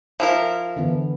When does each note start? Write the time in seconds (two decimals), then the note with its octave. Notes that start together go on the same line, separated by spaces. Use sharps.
0.20 F3 E4 A#4
0.76 D3 E3 B3